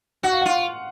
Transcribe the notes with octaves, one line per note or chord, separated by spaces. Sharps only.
F#4 F#5
F5
F4 F#5